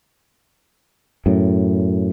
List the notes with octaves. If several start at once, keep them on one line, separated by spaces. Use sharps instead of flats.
F#2 A2